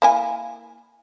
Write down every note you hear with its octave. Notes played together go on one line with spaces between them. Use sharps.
A#3 E4 G#5